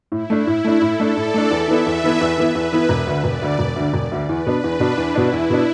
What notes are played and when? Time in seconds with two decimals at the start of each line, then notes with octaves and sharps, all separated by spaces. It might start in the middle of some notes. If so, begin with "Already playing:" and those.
0.12 A2 E4
0.30 A3 D4
0.47 A2
0.64 A3 D4
0.81 A2 A4
1.00 A3 D4
1.16 A2 D5
1.34 A3 D4
1.51 E2 E5
1.68 E3 B3 E4
1.85 E2 B4
2.04 E3 B3 E4
2.21 E2
2.38 E3 B3 E4
2.55 E2 B4
2.72 E3 B3 E4
2.89 E1
3.07 D2 D3
3.24 E1 D5
3.42 D2 D3
3.59 E1
3.76 D2 D3
3.93 E1
4.12 D2 D3
4.28 E2 B4
4.46 B2 B3 D4
4.64 E2 D4
4.80 B2 B3 D4
4.97 E2 E4
5.15 B2 B3 D4
5.32 E2
5.50 B2 B3 D4